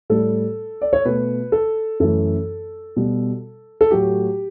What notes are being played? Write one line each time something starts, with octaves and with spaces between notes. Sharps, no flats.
A2 G3 A4
D5
C#5
B2 A3 B4
A4
F#2 E3 A3 A4
B2 G3
A4
A2 F#3 A3 G4